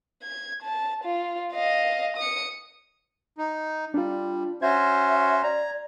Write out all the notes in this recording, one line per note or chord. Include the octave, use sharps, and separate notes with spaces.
G#6
A5
F4
D#5 F5
D#6 C#7
D#4
G3 D4 F4
C#4 F#4 C5 E5 G#6
D5 A#5